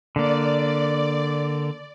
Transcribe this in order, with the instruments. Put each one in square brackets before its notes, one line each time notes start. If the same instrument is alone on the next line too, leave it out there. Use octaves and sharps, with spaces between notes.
[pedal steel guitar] D3 A#3 [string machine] D5